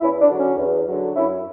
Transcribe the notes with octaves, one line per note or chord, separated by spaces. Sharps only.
E2 C#4 E4
D4
D3 F#3
C#4
E2
D3 F#3
F#2 C#4 E4